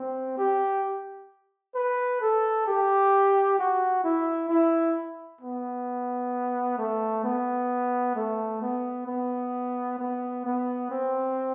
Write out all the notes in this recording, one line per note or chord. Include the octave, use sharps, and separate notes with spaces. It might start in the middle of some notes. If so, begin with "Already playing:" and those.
Already playing: C4
G4
B4
A4
G4
F#4
E4
E4
B3
A3
B3
A3
B3
B3
B3
B3
C4